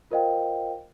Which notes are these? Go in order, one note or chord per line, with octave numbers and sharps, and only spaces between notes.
F4 A#4 C5 D#5 F5 G5